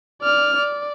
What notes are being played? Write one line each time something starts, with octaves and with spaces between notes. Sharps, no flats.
D5 F6
D5